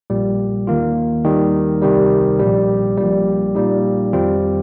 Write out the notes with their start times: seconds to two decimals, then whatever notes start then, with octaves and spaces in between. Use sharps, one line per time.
0.10 A#1 A#2 G3
0.67 D#2 D#3 A#3 F4
1.24 D#2 D#3 G3 D#4
1.82 C2 C3 D#3 G3
2.40 A#1 A#2 G3
2.98 A#1 A#2 G3
3.55 A#2 G3 D#4
4.13 F2 D#3 G3 C4 F4